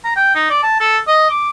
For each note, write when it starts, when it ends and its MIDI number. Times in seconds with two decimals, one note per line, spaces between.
0.04 0.13 82
0.16 0.32 79
0.35 0.46 63
0.50 0.61 74
0.63 0.80 81
0.80 0.97 69
1.07 1.30 75
1.30 1.50 86